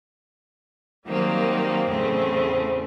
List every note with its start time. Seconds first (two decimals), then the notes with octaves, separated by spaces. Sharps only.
1.05 D#3 F#3 G3 A#3 C4
1.87 E2 A2 C#3 A3 C4 C#4